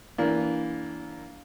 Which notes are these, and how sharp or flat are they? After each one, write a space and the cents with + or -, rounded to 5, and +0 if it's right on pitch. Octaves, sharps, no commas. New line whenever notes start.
E3 +0 A#3 +5 D4 -30